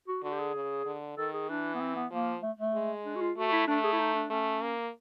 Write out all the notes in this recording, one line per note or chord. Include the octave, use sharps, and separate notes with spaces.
F#4
D3 F#4
G4
G#4
C#3
D3
D#3 A4
G#4
E3 D4
B3
C4
B3
F3 A#3
A3
A3
G#3
D4
F#4
F4
A3 F#4
E4
A3 D4
G#4
E4
D#4
D4
A3 C#4
A#3